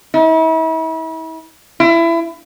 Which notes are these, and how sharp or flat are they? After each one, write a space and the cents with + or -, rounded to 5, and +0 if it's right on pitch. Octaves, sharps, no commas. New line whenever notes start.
E4 -40
E4 +25